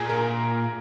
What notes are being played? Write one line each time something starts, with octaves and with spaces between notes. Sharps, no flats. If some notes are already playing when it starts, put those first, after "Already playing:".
Already playing: A#2 G#4
A#4